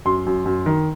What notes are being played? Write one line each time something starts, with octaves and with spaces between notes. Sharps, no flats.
F#2 C6
F#2
F#2
D#3